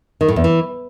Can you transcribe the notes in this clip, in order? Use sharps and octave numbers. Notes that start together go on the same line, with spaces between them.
D#3
A2
E2
E3